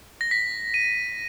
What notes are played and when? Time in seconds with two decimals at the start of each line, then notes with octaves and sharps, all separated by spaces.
0.21 A#6
0.31 B6
0.74 D#7